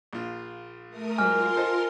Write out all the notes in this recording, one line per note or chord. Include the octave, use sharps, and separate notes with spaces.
A#1 F4
A3 A#4 D#6
G#2 F#3 F4 A#4 G#5 C6 F6
A4 C5 D#5